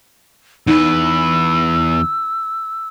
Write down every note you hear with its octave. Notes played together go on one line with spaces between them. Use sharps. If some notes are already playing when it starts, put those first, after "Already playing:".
E2 D#4 B4 E6